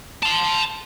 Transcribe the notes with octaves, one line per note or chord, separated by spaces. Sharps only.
A5 C6